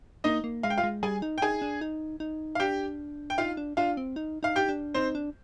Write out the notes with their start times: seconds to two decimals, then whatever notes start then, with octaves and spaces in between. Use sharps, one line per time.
0.24 A#3 D#4 D#5
0.44 A#3
0.63 G#3 F5
0.70 G5
0.78 F4 F5
0.84 G#3
1.03 G3 G#4 G#5
1.22 D#4
1.38 G5
1.42 D#4 G#4 G#5
1.62 D4
1.81 D#4
2.20 D#4
2.55 F5
2.60 D4 G4 G5
3.30 G5
3.38 D#4 F4 F5
3.57 D4
3.77 D4 F4 F5
3.97 C4
4.16 D#4
4.43 D#4 F5
4.56 G4 G5
4.69 D4
4.94 C4 D#4 C5
5.15 D4